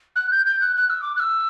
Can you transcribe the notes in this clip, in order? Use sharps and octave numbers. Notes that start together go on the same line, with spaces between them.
F#6
G6
G6
F#6
F#6
E6
D6
F#6
E6